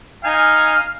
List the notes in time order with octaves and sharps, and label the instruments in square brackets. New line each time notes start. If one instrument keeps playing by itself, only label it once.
[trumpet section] D#4 G#5 [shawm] F5